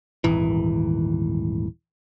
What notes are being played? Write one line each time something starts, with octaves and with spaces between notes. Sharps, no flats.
D#1 G#1 E3